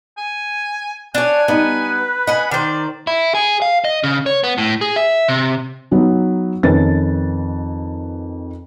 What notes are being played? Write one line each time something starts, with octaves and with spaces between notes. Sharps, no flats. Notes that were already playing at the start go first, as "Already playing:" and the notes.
G#5
D4 C#5 F#5 G#5
G3 B3 D#4 B4
D#5 F#5 G#5 B5
D#3 C5 D5
E4
G#4
F5
D#5
C#3
C#5
B3
A2
G#4
E5
C3
F#3 B3 D#4
F2 D#3 C#4 B4 A6